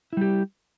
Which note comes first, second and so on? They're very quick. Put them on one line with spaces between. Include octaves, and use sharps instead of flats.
E4 G3 G4